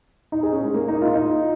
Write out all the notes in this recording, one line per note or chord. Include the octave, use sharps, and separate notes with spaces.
D#4
G#4
C#4
G#3
A#3
D#4
F4
D#4